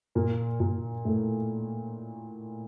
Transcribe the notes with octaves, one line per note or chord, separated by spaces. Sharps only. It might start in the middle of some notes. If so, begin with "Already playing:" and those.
A#2 A#3
A#2 A#3
A2 A3